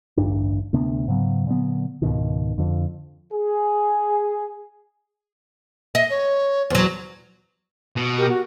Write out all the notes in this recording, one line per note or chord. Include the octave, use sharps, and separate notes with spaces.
A1 D2 G2 D4
D2 C3 B3 D4
G#2 C#3 F#3 B3
A#2 D3 F#3 B3
C#2 G#2 B2 D#3
F2 D3 F3
G#4
D#5 E5
C#5
E2 F#3 C5
B2
G4 A#4
F#4